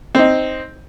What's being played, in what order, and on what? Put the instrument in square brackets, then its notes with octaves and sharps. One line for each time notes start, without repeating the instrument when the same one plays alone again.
[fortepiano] C4 D#4